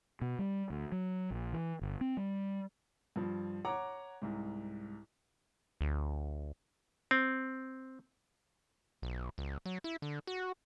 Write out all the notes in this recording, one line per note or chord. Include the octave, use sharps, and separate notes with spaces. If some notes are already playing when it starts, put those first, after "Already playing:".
B2
G3
D2
F#3
A#1
E3
G1
C4
G3
G2 F3
C#5 F#5 A#5 D6
C2 G#2
D2
C4
B1
C#2
F#3
E4
D3
F#4